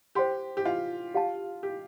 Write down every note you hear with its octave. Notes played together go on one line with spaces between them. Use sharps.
G4 C5 G5 C6
G4
F4
G4 F5 A5
G4